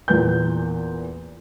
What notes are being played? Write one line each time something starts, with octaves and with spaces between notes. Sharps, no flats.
E2 A#2 B4 G6